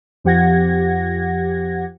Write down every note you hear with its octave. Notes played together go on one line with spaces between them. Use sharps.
F2 F3 G4 F#5 G#6 A#6